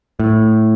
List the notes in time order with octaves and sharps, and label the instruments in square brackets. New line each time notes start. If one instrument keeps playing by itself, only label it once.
[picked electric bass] A2